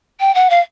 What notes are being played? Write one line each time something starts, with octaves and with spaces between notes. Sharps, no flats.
G5
F#5
F5